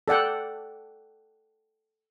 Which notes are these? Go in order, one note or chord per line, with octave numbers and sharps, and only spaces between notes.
A4 D5 F#5 G5